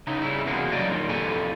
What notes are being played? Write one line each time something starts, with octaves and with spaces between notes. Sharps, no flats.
C#3 D#4 E4 D#5
C#3 G3 E4
E2 C3 A#3 F#4 G#4
C#3 F#3 G3 D4 D5 D#5
A#2 D#3
F2 E4 G4 A4 G#5